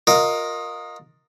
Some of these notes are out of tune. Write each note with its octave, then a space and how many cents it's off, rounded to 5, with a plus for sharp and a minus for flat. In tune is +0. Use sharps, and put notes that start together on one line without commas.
F4 +30 A#4 +0 D#5 +0